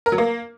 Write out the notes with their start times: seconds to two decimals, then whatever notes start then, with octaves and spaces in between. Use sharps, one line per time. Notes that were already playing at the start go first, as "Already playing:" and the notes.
0.06 A#4
0.12 F#3
0.18 A#3